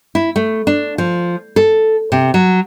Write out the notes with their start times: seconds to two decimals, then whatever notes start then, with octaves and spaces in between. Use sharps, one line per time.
0.15 E4
0.36 A3
0.67 D4
0.98 F3
1.56 A4
2.12 C3
2.34 F#3